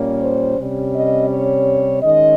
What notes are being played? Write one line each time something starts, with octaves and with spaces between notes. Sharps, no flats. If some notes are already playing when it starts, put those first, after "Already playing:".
Already playing: A#2 G3 A#3 C#4
C5
C3 G3 C#4
D#5
C#5
D#3 G#3 C#4 D#5